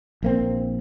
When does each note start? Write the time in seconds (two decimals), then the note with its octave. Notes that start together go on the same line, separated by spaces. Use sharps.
0.23 A#1 A#3 C4